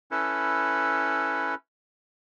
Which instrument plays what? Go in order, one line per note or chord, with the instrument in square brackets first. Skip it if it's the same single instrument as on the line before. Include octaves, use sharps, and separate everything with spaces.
[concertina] C#4 E4 A4 B4